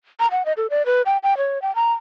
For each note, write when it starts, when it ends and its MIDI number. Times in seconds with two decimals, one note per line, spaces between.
0.20 0.27 82
0.31 0.46 78
0.46 0.53 75
0.57 0.67 69
0.70 0.85 74
0.86 1.02 71
1.06 1.18 79
1.23 1.37 79
1.37 1.61 73
1.62 1.74 79
1.75 1.92 82